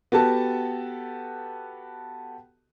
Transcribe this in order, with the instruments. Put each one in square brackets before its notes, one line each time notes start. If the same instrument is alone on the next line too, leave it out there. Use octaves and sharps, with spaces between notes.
[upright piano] B3 F#4 G4 A4 A5